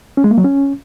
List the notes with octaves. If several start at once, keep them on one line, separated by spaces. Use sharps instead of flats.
C#4
G#3
A#3
F#3
C#4